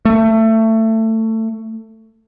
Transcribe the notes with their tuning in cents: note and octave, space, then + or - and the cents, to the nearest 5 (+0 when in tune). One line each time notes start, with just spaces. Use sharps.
A3 +20